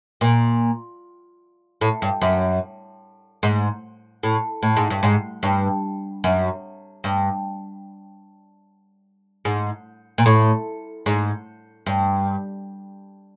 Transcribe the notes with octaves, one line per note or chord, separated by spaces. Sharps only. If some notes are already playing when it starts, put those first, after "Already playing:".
A#2
A2
G2
F#2
G#2
A2
A2
G#2
G2
G#2
G2
F#2
G2
G#2
A#2
A2
G#2
G2